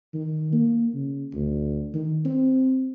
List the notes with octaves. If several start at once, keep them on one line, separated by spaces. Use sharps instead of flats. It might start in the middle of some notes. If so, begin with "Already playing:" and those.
D#3
A#3
C#3
D2
D#3
C4